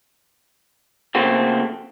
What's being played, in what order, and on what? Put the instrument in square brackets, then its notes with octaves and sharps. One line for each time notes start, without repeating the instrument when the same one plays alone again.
[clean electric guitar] C#3 F3 A3 A#3 C4 F#4